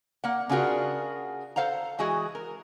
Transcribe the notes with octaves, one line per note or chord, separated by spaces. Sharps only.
A#3 F#5
C#3 D4 F4 F#4 G#4 A#4
A4 C5 F5 F#5 A#5
E3 G#3 F#4 G#4 D#5
A#4